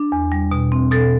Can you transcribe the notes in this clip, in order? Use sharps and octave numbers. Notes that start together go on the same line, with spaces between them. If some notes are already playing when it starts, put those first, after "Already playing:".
Already playing: D4
E2
G3
B2
C4
B2 A4